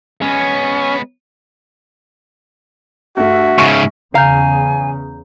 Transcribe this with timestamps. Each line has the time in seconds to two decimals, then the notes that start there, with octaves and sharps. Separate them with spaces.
0.22 G#3 B3 C#4
3.17 G2 A3 F#4 E5
3.58 G#2 C#3 C#6
4.15 E2 C#3 F5 G#5 A#5 G6